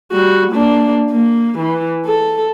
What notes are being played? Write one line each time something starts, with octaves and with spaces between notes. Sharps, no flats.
G3 F#4
A#3 D4
A#3
E3
A4